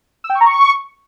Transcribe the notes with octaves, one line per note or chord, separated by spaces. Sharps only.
E6
G5
C#6
A#5
C#6